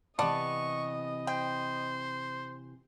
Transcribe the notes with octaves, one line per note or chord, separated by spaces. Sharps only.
C3 E3 B3 D5 D#5 A5 C#6
C5 G5